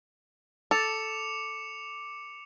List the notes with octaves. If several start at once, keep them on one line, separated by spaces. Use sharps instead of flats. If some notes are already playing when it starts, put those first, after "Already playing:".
A4 D6 C#7 F7